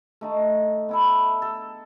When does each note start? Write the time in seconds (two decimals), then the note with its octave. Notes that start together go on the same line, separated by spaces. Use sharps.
0.21 A3 D#4 A5
0.89 B3 E4 A4
1.42 A4